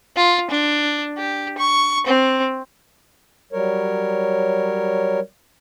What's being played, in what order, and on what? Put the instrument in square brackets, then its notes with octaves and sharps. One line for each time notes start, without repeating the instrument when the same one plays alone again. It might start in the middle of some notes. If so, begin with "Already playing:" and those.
[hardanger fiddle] F4
D4
G4
C#6
C4
[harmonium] F#3 G3 A#4 C#5